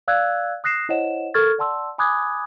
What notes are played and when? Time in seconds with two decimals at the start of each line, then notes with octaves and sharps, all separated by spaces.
0.08 D5 F5 E6 F#6 G#6
0.64 D#6 F#6 A#6 C7 E7
0.89 E4 C5 C#5 D#5 F#5 E7
1.34 A4 A#4 C#6 F6 G#6 A6
1.58 D5 F#5 A5 C6 E6
1.98 G#5 B5 D6 D#6 F#6 G#6